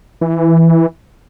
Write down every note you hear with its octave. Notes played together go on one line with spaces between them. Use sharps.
E3